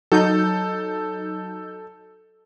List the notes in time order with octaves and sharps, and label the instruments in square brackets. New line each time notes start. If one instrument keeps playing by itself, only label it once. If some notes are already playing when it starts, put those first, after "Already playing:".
[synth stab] F#3 D#4 G6 [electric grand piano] A4